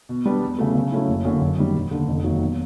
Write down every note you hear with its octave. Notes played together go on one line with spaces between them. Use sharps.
B2
G3 B3 D4
E2
C#3 F#3 A3
C#3
F#3 A3 C#4 E4
F#1
F#2 D3 F#3 A#3
F#2
D#3 G3
E1
D#2 D3
F1
D#2 D#3 F#3
B2